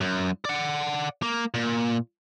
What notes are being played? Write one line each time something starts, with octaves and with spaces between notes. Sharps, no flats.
F#2
D5 F#5
A#3
A#2